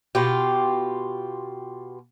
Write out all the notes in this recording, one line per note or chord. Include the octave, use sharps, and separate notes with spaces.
B2 F4 G4